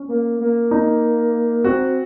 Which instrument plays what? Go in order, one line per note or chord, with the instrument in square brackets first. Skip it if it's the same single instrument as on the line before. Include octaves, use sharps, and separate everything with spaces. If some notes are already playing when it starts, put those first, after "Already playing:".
Already playing: [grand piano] C#4
[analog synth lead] A#3
A#3
[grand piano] D#4
[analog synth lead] C4 [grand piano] F#4